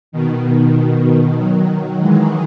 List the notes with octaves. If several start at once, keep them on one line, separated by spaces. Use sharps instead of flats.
B2 D#3
D#3 F#3
E3 G#3